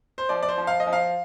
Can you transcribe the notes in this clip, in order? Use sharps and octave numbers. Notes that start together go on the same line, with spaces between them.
C5
F3 D5
D5
C5
F3
F5
D#5
F3
F5